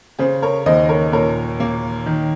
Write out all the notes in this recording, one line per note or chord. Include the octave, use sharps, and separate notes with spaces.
C#3 G#4 C5
A#4 C#5
D#2 C5 D#5
A#4 C#5
A#2 A#4 C#5
A#3
D#3